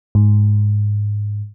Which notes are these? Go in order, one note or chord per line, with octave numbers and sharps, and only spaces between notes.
G#2